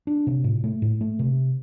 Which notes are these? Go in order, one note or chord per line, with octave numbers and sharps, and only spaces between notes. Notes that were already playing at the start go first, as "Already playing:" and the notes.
D4
C3
A2
A3
A2
A3
C3